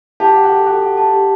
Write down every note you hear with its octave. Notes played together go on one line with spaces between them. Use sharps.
G4 A5
F#5
F#4
A4
F#4 A4
A4
A5
G4